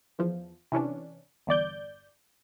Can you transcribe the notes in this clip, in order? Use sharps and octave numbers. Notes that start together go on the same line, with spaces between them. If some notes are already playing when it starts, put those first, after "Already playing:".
E2 F3
C3 E3 C#4 D4
G1 E2 D5 G6